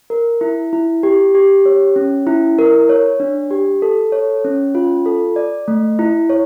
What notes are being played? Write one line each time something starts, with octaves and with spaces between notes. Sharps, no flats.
A#4
E4
E4
G4
G4
C#5
C#4
E4
A#4
C#5
D4
G4
A4
C#5
C#4
F4
A4
D5
A3
E4
C#5